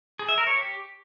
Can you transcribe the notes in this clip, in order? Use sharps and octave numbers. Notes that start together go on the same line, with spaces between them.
G#4
E5
A#4
C#5
G4